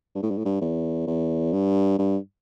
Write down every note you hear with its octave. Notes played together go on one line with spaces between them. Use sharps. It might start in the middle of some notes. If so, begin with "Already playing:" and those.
G2
A2
G2
A2
G2
E2
E2
G2
G2